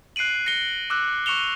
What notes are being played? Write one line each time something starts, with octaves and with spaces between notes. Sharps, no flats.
F#6 C7 D7 D#7 F#7
A#6 C#7 D#7 G7
D6 E6 F#6
C#6 F#6 C#7 E7 F7 G7